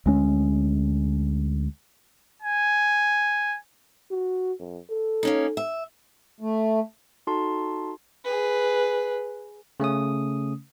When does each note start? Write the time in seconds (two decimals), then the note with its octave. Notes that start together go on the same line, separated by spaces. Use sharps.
0.06 D2 G#3 C#4
2.42 G#5
4.11 F#4
4.60 F2
4.90 A4
5.23 A#3 C#4 D#4
5.57 E5
6.40 A3
7.27 D#4 F#4 A4 A5 C6
8.25 G#4 B4
9.80 C#3 A3 C#4 D#6